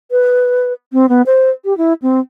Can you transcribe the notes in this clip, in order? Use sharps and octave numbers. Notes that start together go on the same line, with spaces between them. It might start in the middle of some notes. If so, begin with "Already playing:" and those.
B4
C4
B3
C5
G4
E4
C4